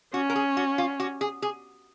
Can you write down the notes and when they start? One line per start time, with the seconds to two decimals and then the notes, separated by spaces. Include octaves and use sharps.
0.14 C#4 F#4
0.30 A#4
0.36 G#4
0.57 F#4
0.78 F4
1.00 F#4
1.21 G#4
1.42 G#4